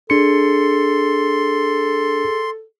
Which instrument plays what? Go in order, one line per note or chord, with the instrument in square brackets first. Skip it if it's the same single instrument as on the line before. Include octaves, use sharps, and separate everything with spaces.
[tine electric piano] D4 C#7 [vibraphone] G#4 [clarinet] A4 [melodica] C6